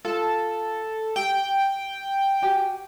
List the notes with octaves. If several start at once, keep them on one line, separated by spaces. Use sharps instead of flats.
F4 A4
G4 G5
F#4 G4 G#5